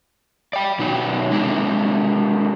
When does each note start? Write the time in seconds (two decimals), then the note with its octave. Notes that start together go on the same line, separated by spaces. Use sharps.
0.53 D5 G5
0.79 B2 F#3 D#4 D5
1.31 C3 G#3 C4 D4 G4